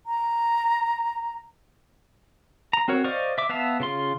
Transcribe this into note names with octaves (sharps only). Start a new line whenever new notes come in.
A#5
A#5
C4 F#4 A#4 C#5
C5 D5 D#5 F5 C#6
E5 D6
B3 E5 F5 A5
C#3 F4 C6